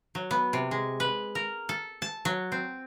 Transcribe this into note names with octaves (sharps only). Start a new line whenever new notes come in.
F#3
B3
C3
G#3
B4
A#4
A4
A5
F#3
C4